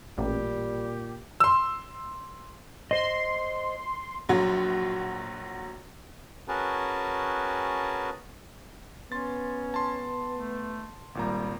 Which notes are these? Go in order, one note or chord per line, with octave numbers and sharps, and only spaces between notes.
A1 A#2 G3 G4
C6 E6
C5 D#5 C6
A#1 F#3 F#4
C#4 F#4 G#4 A#4 B4 A5
B3 C#4 C6 A6
A5 C6
A3
G#1 A#2 G3 A#5